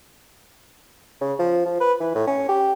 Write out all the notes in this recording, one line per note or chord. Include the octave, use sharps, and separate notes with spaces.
C#3
F3
F3
B4
E3
A2
C#4
G4